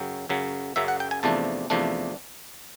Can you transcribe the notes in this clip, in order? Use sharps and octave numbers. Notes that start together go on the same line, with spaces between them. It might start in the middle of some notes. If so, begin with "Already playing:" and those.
Already playing: F#2 C#3 F#3 G5
F#2 C#3 F#3
F#2 C#3 F#3 E5
F#5
G5
G#5
E2 C3 F3 A3 D4 A5
E2 C3 F3 A3 D4